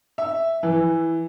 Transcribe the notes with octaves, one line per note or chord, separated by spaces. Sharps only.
E5
E3